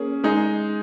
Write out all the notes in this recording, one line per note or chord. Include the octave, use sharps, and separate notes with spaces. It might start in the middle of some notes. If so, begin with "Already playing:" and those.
Already playing: A#3 C#4 G#4
G#3 D#4 G#4